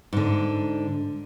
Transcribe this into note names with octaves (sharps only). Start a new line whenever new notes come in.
G#2 D3